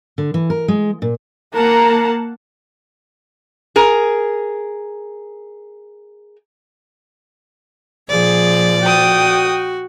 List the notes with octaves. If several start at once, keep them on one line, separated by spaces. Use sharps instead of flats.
D3
E3
A#4
G#3
A#2
A#3 A#4 F#5 A5 A#5
G#4 A#4
A#2 F3 G#4 D5
F#4 G5 D#6